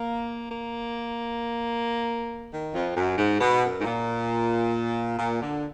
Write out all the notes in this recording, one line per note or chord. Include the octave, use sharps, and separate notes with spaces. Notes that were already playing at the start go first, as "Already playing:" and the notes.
Already playing: A#3
A#3
D#3
F2
F#2
G#2
B2
F#2
G#2
A#2
A#2
D3